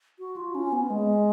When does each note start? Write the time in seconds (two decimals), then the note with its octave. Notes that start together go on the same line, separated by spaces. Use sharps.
0.19 F#4
0.36 F4
0.55 C#4
0.72 B3
0.90 G#3